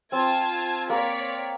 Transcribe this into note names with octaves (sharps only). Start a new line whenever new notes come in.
C4 F4 A5 G#6
A#3 A#4 C#5 D5 B6